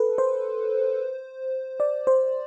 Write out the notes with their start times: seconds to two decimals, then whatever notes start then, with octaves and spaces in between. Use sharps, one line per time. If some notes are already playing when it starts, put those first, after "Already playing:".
Already playing: A4 B4
0.18 C5
1.80 D5
2.07 C5